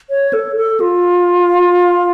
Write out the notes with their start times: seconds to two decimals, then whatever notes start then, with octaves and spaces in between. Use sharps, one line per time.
0.10 C#5
0.33 A4
0.56 A4
0.80 F4